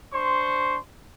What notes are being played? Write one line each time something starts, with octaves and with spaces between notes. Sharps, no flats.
D4 C5 C6 C#6